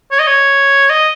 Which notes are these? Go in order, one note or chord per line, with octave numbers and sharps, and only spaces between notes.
C#5
D#5
C#5
D#5